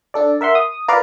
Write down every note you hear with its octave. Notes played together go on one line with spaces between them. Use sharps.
D4 A4 D5
A#4 E5 F#5 C6
D#6
F4 A#4 B4 D5 F5